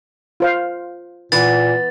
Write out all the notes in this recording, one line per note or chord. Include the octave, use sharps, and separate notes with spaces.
F4 C5 F5
A#2 E3 B3 A6